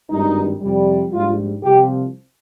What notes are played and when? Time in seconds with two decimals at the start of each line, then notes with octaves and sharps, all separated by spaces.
0.10 G#1 G2 D#3 G3 D#4
0.61 F2 C3 G3
1.13 A#1 G#2 G3 F4
1.64 C2 C3 F3 G4